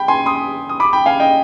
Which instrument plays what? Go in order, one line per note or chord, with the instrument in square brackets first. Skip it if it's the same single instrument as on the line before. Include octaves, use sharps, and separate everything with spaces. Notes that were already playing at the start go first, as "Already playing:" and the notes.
Already playing: [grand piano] G5 B5
G#5 C6
C6 D#6
D#6
B5 D6
G5 B5
F5 G#5
D#5 G5